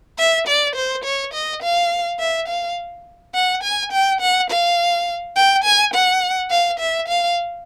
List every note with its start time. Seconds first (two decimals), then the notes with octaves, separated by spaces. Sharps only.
0.18 E5
0.47 D5
0.76 C5
1.04 C#5
1.34 D#5
1.63 F5
2.19 E5
2.48 F5
3.35 F#5
3.63 G#5
3.92 G5
4.21 F#5
4.50 F5
5.36 G5
5.64 G#5
5.94 F#5
6.51 F5
6.80 E5
7.08 F5